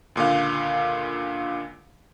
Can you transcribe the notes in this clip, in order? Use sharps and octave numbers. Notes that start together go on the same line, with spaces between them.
C#2 A#2 D3 F5